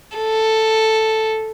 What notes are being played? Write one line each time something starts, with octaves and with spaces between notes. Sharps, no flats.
A4